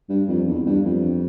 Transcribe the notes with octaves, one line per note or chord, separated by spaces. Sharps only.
G2
F2
E2
G2
F2